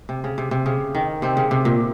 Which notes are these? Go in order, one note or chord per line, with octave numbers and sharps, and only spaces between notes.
C3
C#3
C3
C3
C#3
D#3
C3 C4
C#3
C3
A#2